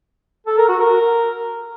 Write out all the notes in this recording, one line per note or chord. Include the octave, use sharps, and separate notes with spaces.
A4
A#4
F#4
A#4